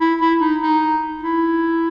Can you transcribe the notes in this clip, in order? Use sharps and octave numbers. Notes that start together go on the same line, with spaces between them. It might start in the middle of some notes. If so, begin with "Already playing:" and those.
E4
E4
D#4
D#4
E4